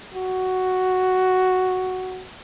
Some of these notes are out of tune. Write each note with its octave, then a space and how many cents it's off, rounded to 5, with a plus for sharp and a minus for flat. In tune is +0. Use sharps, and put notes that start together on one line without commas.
F#4 +5